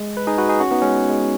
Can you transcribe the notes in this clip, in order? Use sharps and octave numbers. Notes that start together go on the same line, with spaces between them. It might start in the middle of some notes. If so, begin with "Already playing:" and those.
Already playing: G#3
B4
D#4 G#4
F#4 B4
D#4 G#4
C#4 F#4
B3 D#4
G#3 C#4
G#3